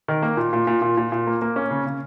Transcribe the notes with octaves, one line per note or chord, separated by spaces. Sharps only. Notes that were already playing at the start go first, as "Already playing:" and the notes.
D#3
A#3
A#2
A#2
A#2
A#2
A#2
A#2
A#3
A#3
C#4
C#3
C#3